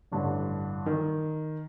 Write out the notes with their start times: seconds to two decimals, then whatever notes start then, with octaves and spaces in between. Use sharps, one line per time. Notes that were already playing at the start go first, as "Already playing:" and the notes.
0.12 A1 G2 D3
0.86 D#3